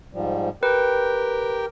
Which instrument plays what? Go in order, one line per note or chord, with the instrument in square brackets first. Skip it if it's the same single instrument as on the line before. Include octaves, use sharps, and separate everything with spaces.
[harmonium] G#2 F3 G3
[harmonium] G4 A#4 G5 [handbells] B4